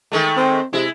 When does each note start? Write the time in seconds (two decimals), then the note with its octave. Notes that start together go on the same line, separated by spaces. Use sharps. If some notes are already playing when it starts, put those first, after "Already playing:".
0.12 D#3 G#3 A3
0.37 C4
0.73 C3 G#3 E4